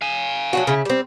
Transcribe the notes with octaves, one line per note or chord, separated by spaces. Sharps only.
F5 G#5
F#3 D4 F#4
C#3 E4
G3 C4